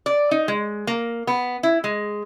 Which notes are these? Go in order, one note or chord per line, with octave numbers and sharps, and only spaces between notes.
D5
D#4
G#3
A#3
B3
E4
G#3